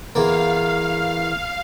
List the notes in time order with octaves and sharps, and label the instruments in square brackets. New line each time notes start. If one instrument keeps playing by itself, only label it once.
[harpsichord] E2 A#3 [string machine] F5